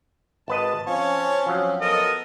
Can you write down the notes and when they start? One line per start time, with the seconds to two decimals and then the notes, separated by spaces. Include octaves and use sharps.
0.48 G#1 B4 D#5 A5
0.87 F3 C4 C#4 C#5 A5
1.46 F3 F#3
1.81 B3 A4 A#4 D#5